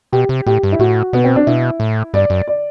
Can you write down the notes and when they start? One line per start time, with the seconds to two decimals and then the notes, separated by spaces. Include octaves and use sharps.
0.13 B2 G4
0.29 C3
0.46 A2 G4
0.63 G2
0.72 E4
0.79 A2 F#4
1.13 B2 B3
1.24 C4
1.36 D4
1.47 B2 E4
1.80 A2
2.14 G2 D5
2.30 F#2
2.48 D5